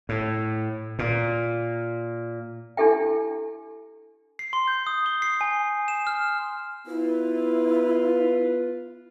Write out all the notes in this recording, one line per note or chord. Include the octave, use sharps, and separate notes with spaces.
A2
A#2
D4 E4 G4 A4 E5 G5
C7
C6
G6
D#6
G7
C7
G#5
E7
F6
B3 E4 F4 B4